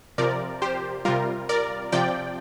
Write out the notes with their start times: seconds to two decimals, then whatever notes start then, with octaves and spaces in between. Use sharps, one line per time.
0.18 C3 F3 A#4 D5
0.62 G4 C5
1.05 C3 G3 F4 A#4
1.49 A#4 D5
1.92 C3 F3 D5 G5